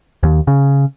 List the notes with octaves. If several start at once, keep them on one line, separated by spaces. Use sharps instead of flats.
D#2
C#3